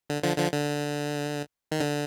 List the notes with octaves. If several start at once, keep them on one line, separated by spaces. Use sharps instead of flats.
D3
D3 F3
D3 F3
D3
D#3
D3